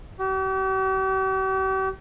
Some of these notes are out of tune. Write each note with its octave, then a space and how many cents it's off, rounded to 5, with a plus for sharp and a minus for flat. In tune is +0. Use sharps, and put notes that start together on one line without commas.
G4 -45